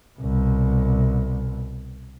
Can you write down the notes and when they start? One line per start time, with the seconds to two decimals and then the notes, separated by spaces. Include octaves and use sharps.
0.19 C2 B2